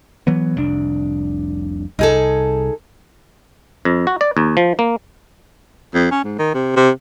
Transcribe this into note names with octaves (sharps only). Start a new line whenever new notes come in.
E3 F#3 B3
F1 C2 D4
C2 D#4 G#4 A4
F2
F#4
D5
D#2
F3
A#3
F2
C#4
G#2
D#3
C3
C3